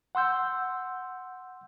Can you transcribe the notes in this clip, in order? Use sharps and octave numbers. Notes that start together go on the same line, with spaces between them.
F#5 C6 E6 G6